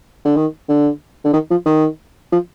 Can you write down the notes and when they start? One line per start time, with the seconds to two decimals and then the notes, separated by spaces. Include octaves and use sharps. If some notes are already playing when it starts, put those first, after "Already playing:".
0.25 D3
0.36 D#3
0.69 D3
1.25 D3
1.33 D#3
1.51 F3
1.66 D#3
2.32 F3